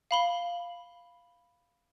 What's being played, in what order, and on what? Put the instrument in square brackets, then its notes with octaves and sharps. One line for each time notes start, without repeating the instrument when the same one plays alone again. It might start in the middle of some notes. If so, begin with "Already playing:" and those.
[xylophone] F5 B5 G7